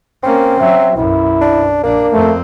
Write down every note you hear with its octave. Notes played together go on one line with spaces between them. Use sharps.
A#3 C4 C#4
F#3 E5
B1 F#2 E4
D4
A#1 A#3 D4
F2 A3 C4